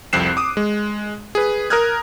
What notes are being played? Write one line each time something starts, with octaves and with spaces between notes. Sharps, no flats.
C2 F2 C4 F#6 C7 E7
D6 D#6
G#3
G#4 B4
A#4 A#5 D#6 F6 F#6 G#6